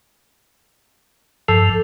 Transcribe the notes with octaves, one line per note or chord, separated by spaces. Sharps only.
G2 F3 A4